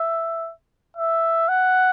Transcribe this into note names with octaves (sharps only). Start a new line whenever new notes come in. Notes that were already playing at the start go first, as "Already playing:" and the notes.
Already playing: E5
E5
F#5